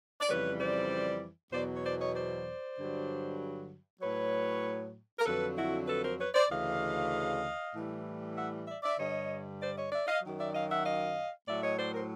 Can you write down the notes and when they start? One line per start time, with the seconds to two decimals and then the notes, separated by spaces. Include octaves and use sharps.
0.21 D5
0.29 F2 C#3 E3 G3 B4 C#5
0.59 C5 D5
1.52 E2 B2 F#3 C5 D5
1.76 C#5
1.84 C5 D5
2.00 C#5 D#5
2.15 C5 D5
2.78 G2 D3 F#3
4.01 A2 F#3 B4 C#5
5.19 A#4
5.25 F2 D3 F#3 A4 B4
5.57 E4 F#4
5.88 A4 B4
6.03 A#4 C5
6.19 B4 C#5
6.34 C5 D5
6.50 D2 C#3 E3 D#5 F5
7.74 A2 E3 G3
8.36 E5 F#5
8.67 D5 E5
8.83 D5 E5
8.98 G2 D3 G3 C#5 D#5
9.61 C5 D5
9.77 C#5 D#5
9.92 D5 E5
10.07 D#5 F5
10.23 F#2 D#3 F#3
10.39 D5 E5
10.54 D#5 F5
10.70 E5 F#5
10.85 D#5 F5
11.47 A2 F#3 D5 E5
11.64 C#5 D#5
11.78 C5 D5
11.94 A#4 C5